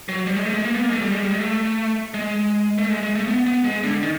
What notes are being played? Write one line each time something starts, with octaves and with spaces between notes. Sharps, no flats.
F#3
G3
G#3
A3
G#3
A#3
B3
A#3
G#3
A3
G3
G#3
G3
G#3
A3
G#3
A3
G#3
G#3
A3
B3
B3
G#3
D3
D#3